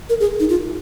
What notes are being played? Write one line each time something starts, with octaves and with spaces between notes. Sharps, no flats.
A#4
G#4
D#4
F4